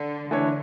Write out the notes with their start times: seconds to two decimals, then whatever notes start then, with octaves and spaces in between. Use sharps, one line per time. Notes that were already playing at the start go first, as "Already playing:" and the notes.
Already playing: D3
0.31 D3 E3 A3 D4 A4 C#5